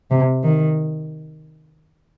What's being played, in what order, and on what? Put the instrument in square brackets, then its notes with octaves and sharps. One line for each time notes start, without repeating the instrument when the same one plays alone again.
[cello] C3
D#3